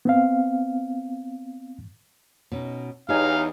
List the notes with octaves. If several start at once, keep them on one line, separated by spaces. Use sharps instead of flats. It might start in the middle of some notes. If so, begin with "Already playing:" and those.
B3 C4 F5
B2 C#4 D#4
E2 D#4 G4 C#5 F5 G#5